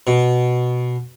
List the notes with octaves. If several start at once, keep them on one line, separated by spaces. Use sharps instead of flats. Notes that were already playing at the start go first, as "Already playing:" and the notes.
B2